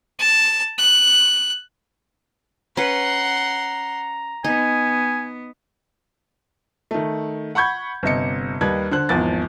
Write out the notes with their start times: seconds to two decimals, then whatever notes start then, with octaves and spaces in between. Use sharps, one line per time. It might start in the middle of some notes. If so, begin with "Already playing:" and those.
0.19 A5
0.78 F#6
2.77 C#4 B4 F#5 A#5 C6
4.44 B3 D#4 G#5
6.91 D#3 A3
7.55 F#5 B5 C#6 G6 G#6
8.03 G1 C3 D#5 C#7
8.61 D#2 G3 D#4 B4 G#6
8.91 D3 C5 F#6
9.09 G#1 E2 F3 A6